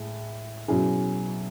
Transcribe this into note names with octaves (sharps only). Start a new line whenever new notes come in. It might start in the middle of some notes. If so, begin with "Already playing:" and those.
Already playing: A2 G#3
B2 F#3 C#4 E4 G#4